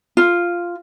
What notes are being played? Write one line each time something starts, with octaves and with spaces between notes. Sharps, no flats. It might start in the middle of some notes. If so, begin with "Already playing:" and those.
F4